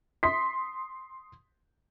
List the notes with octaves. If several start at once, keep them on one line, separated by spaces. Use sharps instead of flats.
C6 D#6 B6